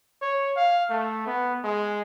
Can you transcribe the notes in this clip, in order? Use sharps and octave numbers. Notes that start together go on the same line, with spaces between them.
C#5
F5
A3
B3
G#3